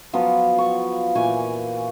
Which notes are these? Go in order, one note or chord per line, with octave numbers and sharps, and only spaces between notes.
F3 F#3 B3 F4
C#6
A#2 E3 G#5 C#6